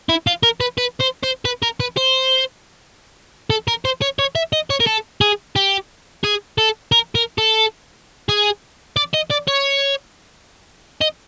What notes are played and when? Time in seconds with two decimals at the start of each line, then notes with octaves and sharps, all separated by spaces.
0.09 E4
0.27 F4
0.43 A#4
0.60 B4
0.78 B4
1.00 C5
1.23 C5
1.45 B4
1.63 A#4
1.80 B4
1.97 C5
3.50 A4
3.68 A#4
3.85 C5
4.02 C#5
4.19 C#5
4.35 E5
4.53 D#5
4.70 C#5
4.80 A#4
4.87 A4
5.21 G#4
5.56 G4
6.24 G#4
6.58 A4
6.92 A#4
7.15 A#4
7.38 A4
8.29 G#4
8.97 D5
9.14 D#5
9.31 D5
9.48 C#5
11.01 D#5